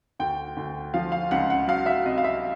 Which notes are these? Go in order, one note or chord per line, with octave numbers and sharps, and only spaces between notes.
D2 G5
D2
F3 F5
F5
C#2 F#5
F#5
F#3 F5
E5
C3 D#5
F5
E5